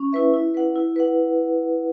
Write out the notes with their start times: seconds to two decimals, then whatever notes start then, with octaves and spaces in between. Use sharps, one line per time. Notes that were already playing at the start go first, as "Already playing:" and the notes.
Already playing: C#4
0.13 E4 B4 E5
0.34 E4
0.54 B4 F#5
0.76 E4
0.96 B4 F#5